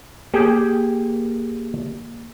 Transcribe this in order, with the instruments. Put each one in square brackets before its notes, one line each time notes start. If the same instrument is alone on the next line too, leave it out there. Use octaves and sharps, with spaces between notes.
[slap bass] A#3 [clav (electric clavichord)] G4 G#4